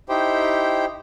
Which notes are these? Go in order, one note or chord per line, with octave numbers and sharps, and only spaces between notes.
D#4 E4 G4 C5 G5